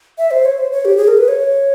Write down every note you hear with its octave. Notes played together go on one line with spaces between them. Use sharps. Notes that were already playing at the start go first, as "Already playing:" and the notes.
E5
C5
C#5
C5
C#5
G4
G#4
A#4
B4
C#5